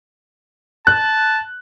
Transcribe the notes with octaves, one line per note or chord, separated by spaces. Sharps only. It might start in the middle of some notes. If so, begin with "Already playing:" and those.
A5 F#6